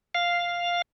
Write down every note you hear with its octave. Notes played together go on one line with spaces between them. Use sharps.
F5